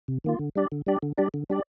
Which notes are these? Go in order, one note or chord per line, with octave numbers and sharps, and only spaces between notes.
C3
D#3 A#3 F4
D3
G3 D4 G4 D5
D3
G3 D4 G4 D5
D3
G3 D4 G4 D5
D3
G3 D4 G4 D5